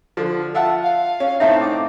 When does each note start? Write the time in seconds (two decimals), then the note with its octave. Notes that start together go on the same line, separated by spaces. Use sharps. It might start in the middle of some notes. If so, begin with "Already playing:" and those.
0.17 D3 F3
0.55 F4 E5 F#5 A5
0.83 F5
1.20 C#4
1.40 A2 C4 D#4 A4 E5
1.60 D6